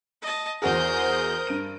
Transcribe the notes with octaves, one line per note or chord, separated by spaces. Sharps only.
D#5 A5
E2 F#4 G#4 A#4 C5 D#6 G6
G2 D7 D#7